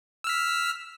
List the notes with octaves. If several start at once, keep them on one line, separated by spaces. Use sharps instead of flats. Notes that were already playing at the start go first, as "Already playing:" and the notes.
E6 F6 B6